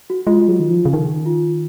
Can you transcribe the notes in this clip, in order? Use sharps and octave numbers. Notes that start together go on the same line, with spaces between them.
F#4
G#3 F4
F#3
D#3
F3
C#3
D#3 D#4
F4